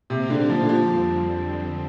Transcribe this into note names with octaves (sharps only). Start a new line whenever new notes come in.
C3 A#3 G4 C5 F5
D3
F3
D3
F3
F2 D3 G3 C4